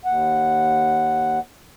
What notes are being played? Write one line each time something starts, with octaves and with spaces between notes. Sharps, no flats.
D#2 F#5